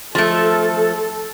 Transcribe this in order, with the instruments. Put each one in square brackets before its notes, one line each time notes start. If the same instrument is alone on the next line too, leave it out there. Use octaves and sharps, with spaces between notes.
[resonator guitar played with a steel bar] F3 A3 [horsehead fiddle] A4